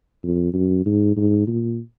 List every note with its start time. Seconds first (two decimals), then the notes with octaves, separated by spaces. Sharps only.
0.23 F2
0.53 F#2
0.86 G#2
1.16 G#2
1.47 A#2